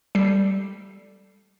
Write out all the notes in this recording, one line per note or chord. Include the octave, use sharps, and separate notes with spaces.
G3 A4 C7